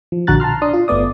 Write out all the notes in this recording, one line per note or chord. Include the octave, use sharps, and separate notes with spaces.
F3
A#1 D3 F#4 A#5 F#6 A6
A5 A#5 C6 F6
D4 C6 D#6
F4
G1 A3 B3 D5 D#6